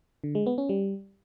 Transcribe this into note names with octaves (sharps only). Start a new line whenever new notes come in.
D3
G#3
B3
C#4
G3